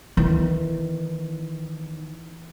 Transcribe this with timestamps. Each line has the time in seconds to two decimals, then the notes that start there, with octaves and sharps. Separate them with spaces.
0.17 D#3 E3